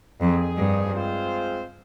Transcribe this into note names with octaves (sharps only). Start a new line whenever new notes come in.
F2 A#2 F3 C4 D#4 G#4
G2
G#3 C4 F4 C5